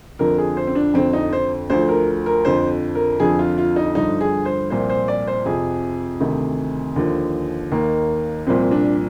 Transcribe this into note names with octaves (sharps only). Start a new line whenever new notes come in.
F2 D3 F3 A#4
G#4
C5
C4
D4
F2 D3 F3 C4
D#4
C5
D2 D3 F3 C5
A#4
A#4
F2 D3 F3 C5
A#4
F2 D3 F3 G#4
F4
F4
D#4
G2 D3 F3 D#4
G#4
C5
C2 A#2 F3 C5
C5
D5
C5
F2 C3 F3 G#4
D2 C3 D#3
D#2 D3 F3
D#2 D#3 A#3
C2 A#2 F3 C4
D4